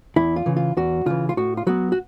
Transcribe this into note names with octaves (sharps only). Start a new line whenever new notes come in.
E2 E4
F4
C#3 E3
F4
E2 F#4
C#3 E3 F4
F4
A2 F#4
F4
F#3 B3 F#4
F#4